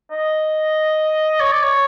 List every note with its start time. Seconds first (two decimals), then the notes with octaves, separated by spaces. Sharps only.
0.11 D#5
1.40 C#5
1.52 D5
1.62 C#5